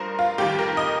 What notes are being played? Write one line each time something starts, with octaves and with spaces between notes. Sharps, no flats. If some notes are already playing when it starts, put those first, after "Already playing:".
Already playing: G2 F3 A#4 C5
F4
F2 D#3 G3 G4
A#4
D#5